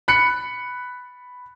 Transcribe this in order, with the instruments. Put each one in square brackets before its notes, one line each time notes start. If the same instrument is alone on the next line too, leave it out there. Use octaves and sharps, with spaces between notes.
[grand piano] B5 F#6 C#7